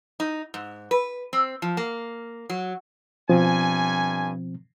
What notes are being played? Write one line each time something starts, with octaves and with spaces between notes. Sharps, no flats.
D#4
G#2
B4
C4
F3
A#3
F#3
G2 B2 F3 C4 G#5